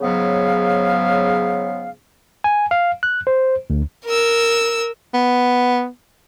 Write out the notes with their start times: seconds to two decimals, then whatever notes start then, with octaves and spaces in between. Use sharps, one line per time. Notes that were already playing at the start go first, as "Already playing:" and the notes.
0.01 G#2 C#3 F#3 B3 F5
2.44 G#5
2.71 F5
3.03 F#6
3.27 C5
3.70 D2
4.06 A#4 E6
5.14 B3